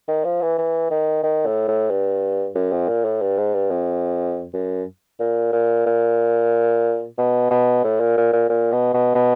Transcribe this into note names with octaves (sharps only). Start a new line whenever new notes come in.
D#3
F3
E3
E3
D#3
D#3
A2
A2
G2
F#2
F2
A#2
A2
G2
G#2
G2
F2
F#2
A#2
A#2
A#2
B2
B2
A2
A#2
A#2
A#2
A#2
B2
B2
B2